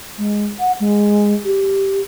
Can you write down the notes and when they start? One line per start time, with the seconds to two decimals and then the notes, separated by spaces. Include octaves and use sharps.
0.18 G#3
0.60 F#5
0.80 G#3
1.44 G4